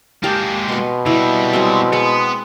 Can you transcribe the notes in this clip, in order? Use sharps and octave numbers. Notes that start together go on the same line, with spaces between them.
G#3 A#3 G4 F5 A5
B2 B4 C6
C3 G3 E4
F#3 G#3 C4
G#3 B3